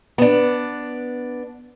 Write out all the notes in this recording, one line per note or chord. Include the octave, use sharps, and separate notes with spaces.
B3 D4